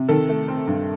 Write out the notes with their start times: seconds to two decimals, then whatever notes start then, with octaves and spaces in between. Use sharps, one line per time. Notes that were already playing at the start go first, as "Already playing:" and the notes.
Already playing: C3
0.09 D#3 A4
0.29 A3
0.48 C4
0.67 G2